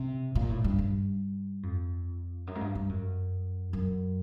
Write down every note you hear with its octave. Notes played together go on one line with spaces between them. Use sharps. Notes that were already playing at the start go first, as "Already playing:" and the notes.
Already playing: C3
A#2
A2
G2
G2
F2
F#2
G#2
G2
G2
F#2
F#2